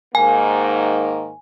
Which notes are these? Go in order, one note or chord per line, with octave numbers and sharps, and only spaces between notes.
G#2 D#3 A#3 G#5